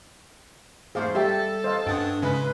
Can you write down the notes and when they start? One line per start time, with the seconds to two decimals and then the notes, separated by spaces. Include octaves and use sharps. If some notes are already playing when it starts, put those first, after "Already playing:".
0.95 E2 G#2 A3 G#4 C5 F5 D6
1.15 G3 G4 A4 E5 G5
1.64 C5 D#5 F5
1.87 G2 C#4 D4 F#5 G5 D#6
2.22 G#2 C#3 G#3 C#4 B4